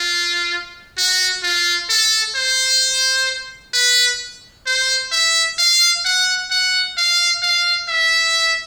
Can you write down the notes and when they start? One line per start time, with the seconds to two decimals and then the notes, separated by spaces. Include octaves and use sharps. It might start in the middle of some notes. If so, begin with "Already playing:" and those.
Already playing: F4
0.98 F#4
1.43 F4
1.90 A4
2.36 C5
3.73 B4
4.66 C5
5.12 E5
5.58 F5
6.05 F#5
6.51 F#5
6.97 F5
7.42 F5
7.88 E5